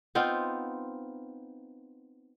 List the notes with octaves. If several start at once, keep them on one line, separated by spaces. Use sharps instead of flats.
B3 C4 D#4 F4